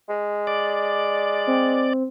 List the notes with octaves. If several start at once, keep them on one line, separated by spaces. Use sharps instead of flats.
G#3
D5
C4